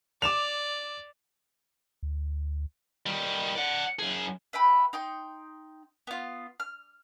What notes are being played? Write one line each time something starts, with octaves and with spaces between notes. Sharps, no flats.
D5 D6 E7 F7
D2
D#3 G3
D5 F#5
F#2 G#4
B4 E5 G5 B5
D#4 G5 C6
B3 F4
F6